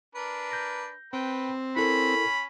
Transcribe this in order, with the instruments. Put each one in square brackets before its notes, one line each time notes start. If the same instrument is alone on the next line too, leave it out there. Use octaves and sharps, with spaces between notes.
[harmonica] D4 A#4 B4
[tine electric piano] G6 A#6
[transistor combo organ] C4 [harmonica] B4 G5
[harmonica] C#4 [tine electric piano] E4 A4 A#4 [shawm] B5